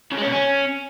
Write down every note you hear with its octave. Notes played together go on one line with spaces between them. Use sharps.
C#3
G#3
C#4
B2
C#4